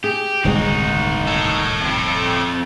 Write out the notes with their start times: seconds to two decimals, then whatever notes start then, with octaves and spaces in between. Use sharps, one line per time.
0.04 G4 G#4
0.44 D1 G1 C2 D#3 G#3 D#4 F#4
1.27 A4 C#5
1.82 F2 C4